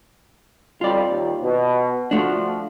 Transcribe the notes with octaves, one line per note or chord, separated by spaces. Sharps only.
F2 G3 F4 D5
D#2
B2
F3 A3 D4 F4 F#4